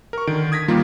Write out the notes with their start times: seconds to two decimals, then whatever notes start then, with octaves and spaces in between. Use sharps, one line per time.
0.13 A#4 C#6
0.27 D3 D#3 D7
0.52 D#6 G#6 A#6 B6
0.68 D#3 F3 G3 A#3 F4